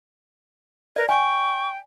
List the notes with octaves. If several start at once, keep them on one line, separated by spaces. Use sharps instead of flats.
A#4 B4 D5
G5 G#5 C#6